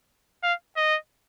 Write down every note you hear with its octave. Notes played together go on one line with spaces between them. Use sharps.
F5
D#5